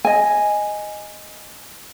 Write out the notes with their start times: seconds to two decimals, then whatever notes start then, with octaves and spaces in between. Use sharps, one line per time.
0.05 D#5 G#5